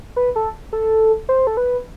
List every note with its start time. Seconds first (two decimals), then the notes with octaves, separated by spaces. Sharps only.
0.16 B4
0.36 A4
0.73 A4
1.29 C5
1.47 A4
1.57 B4